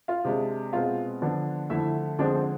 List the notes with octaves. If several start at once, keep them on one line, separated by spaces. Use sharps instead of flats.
F4 F5
C3 G#3 D4
B2 G#3 C4 F4 F5
D3 F3 B3 D4
D3 F3 A3 E4 E5
D3 F3 G#3 C4 D4 D5
C4 C5